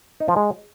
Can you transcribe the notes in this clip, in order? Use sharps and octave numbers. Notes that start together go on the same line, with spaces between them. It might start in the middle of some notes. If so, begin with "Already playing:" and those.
D#4
F3
G#3